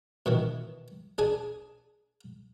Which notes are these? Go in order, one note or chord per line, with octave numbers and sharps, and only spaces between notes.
B2 D#3 E3
D4 G#4 G#5